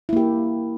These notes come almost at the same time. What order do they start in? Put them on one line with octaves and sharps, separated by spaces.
E4 A#3 G4